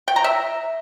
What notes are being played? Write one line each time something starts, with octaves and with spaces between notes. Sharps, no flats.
G5
A#5
E5